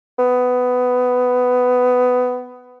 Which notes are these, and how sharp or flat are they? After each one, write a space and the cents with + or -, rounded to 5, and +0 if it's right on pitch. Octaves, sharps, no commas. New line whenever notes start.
B3 +15